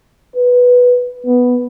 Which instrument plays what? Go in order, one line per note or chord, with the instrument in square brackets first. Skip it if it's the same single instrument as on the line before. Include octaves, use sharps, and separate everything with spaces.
[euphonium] B4
B3